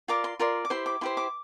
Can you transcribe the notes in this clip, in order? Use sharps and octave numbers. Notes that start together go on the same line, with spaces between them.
F4 A#4 D5 D6
C6
F4 A#4 D5 C6
D6
E4 G4 C5 C6
D6
E4 G4 C5 C6
D6